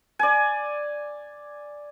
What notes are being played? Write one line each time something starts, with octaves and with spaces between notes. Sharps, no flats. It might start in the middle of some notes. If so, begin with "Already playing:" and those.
D5 G#5